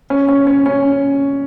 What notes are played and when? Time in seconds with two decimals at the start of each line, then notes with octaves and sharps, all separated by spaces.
0.10 C#4
0.29 C#4
0.47 C#4
0.66 C#4